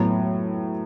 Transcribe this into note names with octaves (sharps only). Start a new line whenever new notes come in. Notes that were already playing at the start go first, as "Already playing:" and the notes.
Already playing: A2 F#3 B3